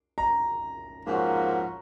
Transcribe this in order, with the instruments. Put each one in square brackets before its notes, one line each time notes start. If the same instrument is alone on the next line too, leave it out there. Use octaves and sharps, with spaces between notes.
[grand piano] A#5
[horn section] G#2 F3 A#3 C#4 F#4